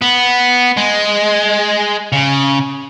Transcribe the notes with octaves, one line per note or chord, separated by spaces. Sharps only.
B3
G#3
C#3